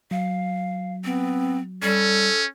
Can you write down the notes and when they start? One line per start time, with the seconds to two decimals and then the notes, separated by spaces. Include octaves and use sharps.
0.11 F#3 F5
1.04 B3 C4
1.82 G3 C#4 A4